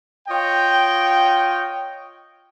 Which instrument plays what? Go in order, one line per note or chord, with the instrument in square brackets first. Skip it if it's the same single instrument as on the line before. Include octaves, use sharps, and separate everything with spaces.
[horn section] F4 C#5 D#5 G5